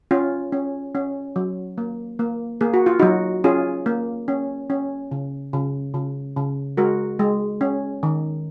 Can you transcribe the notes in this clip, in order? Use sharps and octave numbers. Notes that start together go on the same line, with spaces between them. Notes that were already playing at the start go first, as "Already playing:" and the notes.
C#4 F4
C#4
C#4
F#3
A#3
A#3
A#3 G#4
F#4
F4
F#3 D#4 F#4
C#4 F4 G#4
A#3
C#4
C#4
C#3
C#3
C#3
C#3
G#3 F#4 A#4
G#3
C#4
D#3